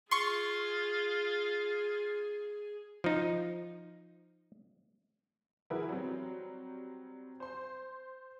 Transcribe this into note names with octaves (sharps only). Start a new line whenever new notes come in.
F4 G#4 C6 C#6
F3 D#4
E3 E4 F#4 G#4 A#4 B4
F#3 G3 C4
C5 C6